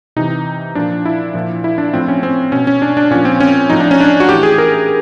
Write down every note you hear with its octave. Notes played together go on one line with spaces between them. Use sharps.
C3 E3 D#4
A#2 F3 D4
E4
A#2 F3
E4
D4
A2 F3 C4
C#4
C4
B2 C#4
C#4
D4
D4
A#2 F3 C#4
C4
C#4
A2 F3 D#4
D4
C#4
D4
F#4
A2 E3 G4
G#4
A#4